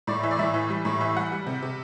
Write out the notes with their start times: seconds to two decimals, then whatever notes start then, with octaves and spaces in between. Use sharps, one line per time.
0.07 A2 D5
0.23 E3 E5
0.31 D5
0.39 A2 E5
0.54 E3
0.70 G3
0.85 A2
1.01 E3 E5
1.16 G3 F#5
1.32 G3
1.47 C3
1.62 C3